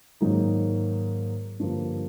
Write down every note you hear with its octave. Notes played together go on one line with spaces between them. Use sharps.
G#2 D#3 F#3 A#3 D#4
G2 D3 F3 A#3